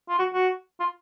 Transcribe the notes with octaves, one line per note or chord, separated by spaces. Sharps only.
F4
F#4
F#4
F4